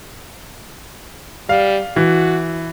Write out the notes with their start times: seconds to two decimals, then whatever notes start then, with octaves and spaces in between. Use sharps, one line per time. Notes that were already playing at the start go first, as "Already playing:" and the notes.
1.49 G3 F5
1.96 E3 F#4